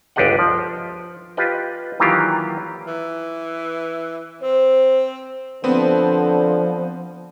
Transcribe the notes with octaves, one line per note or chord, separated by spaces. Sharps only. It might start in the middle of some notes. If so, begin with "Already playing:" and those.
G1 C#2 D4 G4 D#5 F#5
F3
F4 G4 B4 D#5
D#3 E3 F#3 A#3 F4 G4
E3
C4 C5
D3 F3 B3 C4